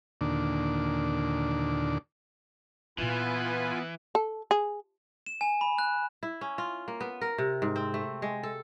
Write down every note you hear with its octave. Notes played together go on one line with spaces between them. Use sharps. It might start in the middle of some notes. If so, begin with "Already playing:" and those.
D#2 A#2 D3 D4
A#2 E3 B3 E4 F4 B4 G#5
A4
G#4
E7
G#5
B5
F#6
E4
C#4
F4
A#3
B3
A#4
C3
G#2
C4
A3
G#3
A4